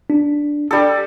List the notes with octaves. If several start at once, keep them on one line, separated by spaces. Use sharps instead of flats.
D4
G3 A4